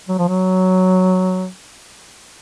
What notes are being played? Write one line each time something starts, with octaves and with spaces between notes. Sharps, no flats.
F#3
F3
F#3